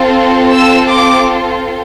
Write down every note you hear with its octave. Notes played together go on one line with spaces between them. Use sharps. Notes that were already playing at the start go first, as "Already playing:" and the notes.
Already playing: C4 F4 A4
E6
D6